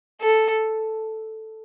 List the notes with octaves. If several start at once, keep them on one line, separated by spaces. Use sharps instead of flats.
A4